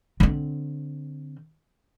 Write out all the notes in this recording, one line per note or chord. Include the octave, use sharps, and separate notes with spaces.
D3 C4